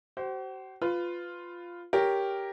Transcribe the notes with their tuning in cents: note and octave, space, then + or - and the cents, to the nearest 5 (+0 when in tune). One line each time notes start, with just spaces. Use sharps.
F#4 +45 C5 +0
F4 +0 B4 +20
G4 +0 A#4 +0 C#5 +0